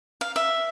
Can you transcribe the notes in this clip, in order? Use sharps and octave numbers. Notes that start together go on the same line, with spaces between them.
F5
E5